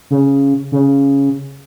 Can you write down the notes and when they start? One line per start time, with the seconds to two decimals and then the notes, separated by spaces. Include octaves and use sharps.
0.10 C#3
0.72 C#3